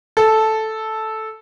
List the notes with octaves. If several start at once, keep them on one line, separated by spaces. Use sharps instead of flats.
A4